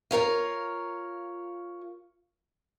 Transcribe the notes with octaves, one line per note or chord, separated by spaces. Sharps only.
F4 A#4 C#5 F5